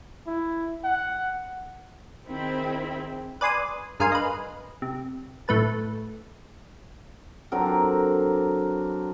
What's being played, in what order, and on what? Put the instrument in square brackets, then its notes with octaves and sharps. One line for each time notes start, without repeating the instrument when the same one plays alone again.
[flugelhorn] E4
F#5
[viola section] D#3 C4 D#4 E4 G#4 B5
[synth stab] B4 D5 G#5 C6 D#6
G2 G#4 A#4 F5 G#5 C6
B4 D#5
C3
A2 A3 B4 A5
[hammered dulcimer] D3 F#3 C4 A#4